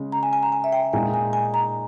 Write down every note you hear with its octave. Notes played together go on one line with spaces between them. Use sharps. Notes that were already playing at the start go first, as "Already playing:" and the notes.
Already playing: C#3 G#3
A#5
G#5
G#5
A#5
G#5
E5
G5
A#2 G#3 D#4 G#5
G#5
G#5
A#5